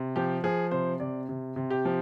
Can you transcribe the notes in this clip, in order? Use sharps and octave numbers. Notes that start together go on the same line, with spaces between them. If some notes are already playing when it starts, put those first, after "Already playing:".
Already playing: C3
F3 G4
F3 G#4
C3 C5
C3 D5
C3
C3
G4
F3